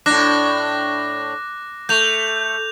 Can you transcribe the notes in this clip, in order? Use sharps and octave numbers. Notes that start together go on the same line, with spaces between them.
A2 D4 D6 F#6 A#6
A3 G6 F7